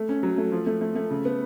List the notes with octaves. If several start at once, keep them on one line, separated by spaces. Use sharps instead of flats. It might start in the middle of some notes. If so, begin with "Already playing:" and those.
Already playing: A3
C#4
F#3
A3
F3
A3
A3
A3
C#3
B3